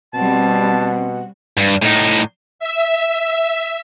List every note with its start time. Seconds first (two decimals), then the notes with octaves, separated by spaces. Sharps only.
0.14 B2 G3 C4 F#5 A5
1.58 G2
1.83 A2 D#4
2.59 E5